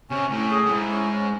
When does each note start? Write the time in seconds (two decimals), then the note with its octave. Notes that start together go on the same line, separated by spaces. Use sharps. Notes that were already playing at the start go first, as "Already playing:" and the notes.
0.10 C3 C#4
0.30 A2 C#4
0.51 G#4
0.66 A2
0.71 G#2 E4
0.91 C#4
1.12 C#4